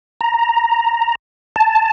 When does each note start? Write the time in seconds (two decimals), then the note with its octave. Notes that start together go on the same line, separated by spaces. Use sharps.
0.21 A#5
1.56 A5